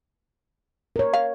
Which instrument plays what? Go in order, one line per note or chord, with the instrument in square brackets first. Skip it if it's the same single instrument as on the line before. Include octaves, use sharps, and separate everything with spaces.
[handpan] A#4 C#5
[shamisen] F5